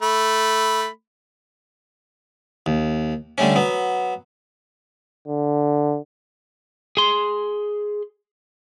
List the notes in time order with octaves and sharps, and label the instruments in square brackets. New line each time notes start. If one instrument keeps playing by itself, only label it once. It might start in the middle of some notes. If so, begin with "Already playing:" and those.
[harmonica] A3 B5
[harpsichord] D#2
D3 G3 A3 C#4
F#3 B3
[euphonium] D3
[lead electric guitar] G#4 C6